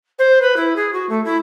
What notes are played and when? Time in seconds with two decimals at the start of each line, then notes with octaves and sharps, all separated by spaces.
0.19 C5
0.41 B4
0.56 E4
0.76 G#4
0.93 F#4
1.09 A3
1.25 E4